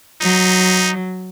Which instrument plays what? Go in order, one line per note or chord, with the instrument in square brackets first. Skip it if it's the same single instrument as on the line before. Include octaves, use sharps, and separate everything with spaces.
[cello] F#3 [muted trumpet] D#4